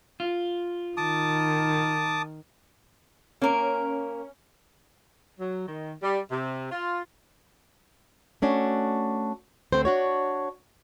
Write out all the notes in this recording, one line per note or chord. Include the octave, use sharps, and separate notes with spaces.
F4
D#3 A5 D6 D#6
A#3 C#4 A#4
F#3
D#3
G3
C3
F4
A3 C#4 D4 F#4
D2 A3 C4 A4 C5
D4 F#4 C#5